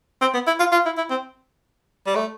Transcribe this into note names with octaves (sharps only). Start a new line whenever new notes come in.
C4
B3
E4
F4
F4
E4
E4
C4
G3
A3